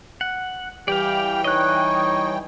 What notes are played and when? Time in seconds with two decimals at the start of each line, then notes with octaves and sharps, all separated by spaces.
0.21 F#5
0.88 E3 G3 G4 D5 F5 G5
1.44 D#4 C#5 D#5 F#6